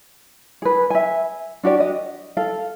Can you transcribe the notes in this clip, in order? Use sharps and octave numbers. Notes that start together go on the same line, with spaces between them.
G#4 B4
E5 G#5
D4 F#4 G4 D5
D#5
A4 F5